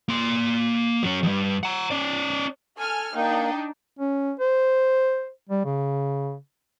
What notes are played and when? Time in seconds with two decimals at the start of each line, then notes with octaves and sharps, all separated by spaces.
0.08 A#3 C6
1.03 F#3 C#4
1.23 E2 G2
1.63 F#5 A#5
1.91 C#4 D5
2.77 A4 G#5 F6
3.15 A#3 D4 D#4 G5
3.99 C#4
4.40 C5
5.49 G3
5.65 C#3